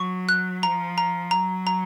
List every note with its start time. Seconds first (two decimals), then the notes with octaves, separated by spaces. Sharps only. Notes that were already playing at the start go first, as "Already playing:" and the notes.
Already playing: F#3 C#6
0.29 F#6
0.62 F3 A#5
0.98 A#5
1.31 F#3 A#5
1.67 A#5